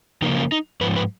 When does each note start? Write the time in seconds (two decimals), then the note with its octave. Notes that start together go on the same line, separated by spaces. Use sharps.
0.22 C#3 F3 A#3 D#4
0.37 C#4
0.52 D#4
0.81 G#2 F3 B4
0.96 B4